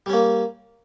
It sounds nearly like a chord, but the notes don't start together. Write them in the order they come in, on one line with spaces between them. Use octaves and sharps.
G3 C#4 A#3